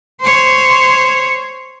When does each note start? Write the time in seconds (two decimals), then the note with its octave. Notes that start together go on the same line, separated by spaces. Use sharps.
0.21 C5 C#5